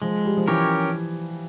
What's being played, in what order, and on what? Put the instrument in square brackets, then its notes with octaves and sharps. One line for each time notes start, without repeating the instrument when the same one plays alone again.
[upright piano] F3 [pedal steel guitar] G#3
[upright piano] G3
F3
[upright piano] E3 [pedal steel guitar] C#4 G4 A#4 C#5